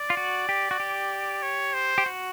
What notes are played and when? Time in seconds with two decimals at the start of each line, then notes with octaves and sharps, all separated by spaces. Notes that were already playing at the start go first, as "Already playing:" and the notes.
Already playing: D5
0.10 F4
0.17 F#4
0.49 G4
0.71 F#4
0.80 G4
1.43 C#5
1.74 C5
1.98 G4
2.06 F#4